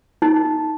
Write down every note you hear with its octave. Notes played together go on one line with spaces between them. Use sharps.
D#4